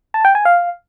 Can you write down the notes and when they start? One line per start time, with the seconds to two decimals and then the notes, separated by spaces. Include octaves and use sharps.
0.14 A5
0.25 G5
0.35 G#5
0.45 F5